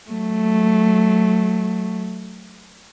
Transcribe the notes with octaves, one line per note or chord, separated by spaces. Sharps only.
F#3 A3